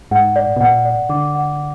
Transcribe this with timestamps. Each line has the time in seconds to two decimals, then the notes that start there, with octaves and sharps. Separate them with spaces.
0.11 G#2 F#5
0.36 D5
0.56 B2
0.61 A#2 F#5
0.85 D5
1.09 D3 D6
1.35 F#5